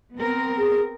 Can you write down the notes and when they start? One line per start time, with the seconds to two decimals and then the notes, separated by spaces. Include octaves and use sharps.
0.16 B3 C4 A#4
0.58 G#4